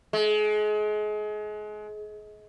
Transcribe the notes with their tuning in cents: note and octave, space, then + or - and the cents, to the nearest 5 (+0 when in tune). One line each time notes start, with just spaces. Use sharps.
G#3 +30